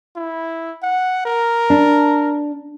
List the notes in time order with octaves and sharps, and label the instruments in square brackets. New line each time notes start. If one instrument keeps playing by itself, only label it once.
[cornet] E4
F#5
A#4
[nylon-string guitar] D4